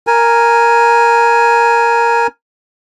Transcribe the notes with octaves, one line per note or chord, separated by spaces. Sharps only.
A#4 G#5